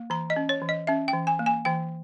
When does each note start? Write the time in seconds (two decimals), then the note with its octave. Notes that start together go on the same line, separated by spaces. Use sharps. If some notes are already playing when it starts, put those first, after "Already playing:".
Already playing: A#3
0.10 E3 A#5
0.30 D#5
0.36 C#4
0.49 C#5
0.62 E3
0.69 D#5
0.87 C#4 E5
1.08 G5
1.13 E3
1.27 G#5
1.39 A#3
1.46 G#5
1.65 E3 G5